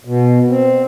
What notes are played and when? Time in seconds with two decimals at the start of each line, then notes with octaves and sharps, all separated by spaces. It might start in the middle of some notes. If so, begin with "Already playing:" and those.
0.05 B2
0.48 C4